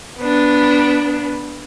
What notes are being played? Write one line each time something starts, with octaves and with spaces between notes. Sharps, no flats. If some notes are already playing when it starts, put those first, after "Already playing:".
B3 D4